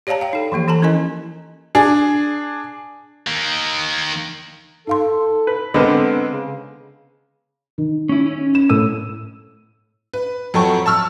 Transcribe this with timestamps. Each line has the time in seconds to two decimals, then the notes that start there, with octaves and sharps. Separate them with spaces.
0.07 G4 C#5 D5 F5 A5 A#5
0.21 F5 G5
0.33 D#4 A4
0.52 E3 F3 A#3 G4
0.68 E3 A4 A5 A#5
0.82 C#4 E4 A#4 D#5 G#5
1.75 D4 G#4
3.27 D#3 A#3
4.87 D#4 A4 F5 C6
5.47 B4
5.74 D3 G#3 B3 C4 A4 A#4 B5
6.31 C#3
7.78 D#3
8.09 C#4 E4
8.26 C#4
8.55 E7
8.69 A2 E6 D#7
10.14 B4
10.54 F2 F#3 A4 G5 C#6
10.86 A5 C#6 E6 F6